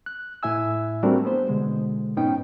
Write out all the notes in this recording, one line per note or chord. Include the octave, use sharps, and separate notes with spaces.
F#6
A2 E4 E5 G#5 E6
G3 A3 C4 D4 F#4 A#4
B3 C5
B2 D3 G#3
G#2 B3 C#4 D#4 G5